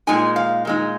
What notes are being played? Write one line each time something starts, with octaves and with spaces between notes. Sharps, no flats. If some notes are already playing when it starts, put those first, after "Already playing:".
A#2 G#3 D#4 G#5
F5
A#2 G#3 D#4